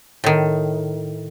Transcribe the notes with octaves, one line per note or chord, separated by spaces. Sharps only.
A2 D#3